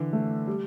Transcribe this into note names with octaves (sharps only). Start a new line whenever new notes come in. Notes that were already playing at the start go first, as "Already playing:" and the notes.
Already playing: D3 E3
A3
G3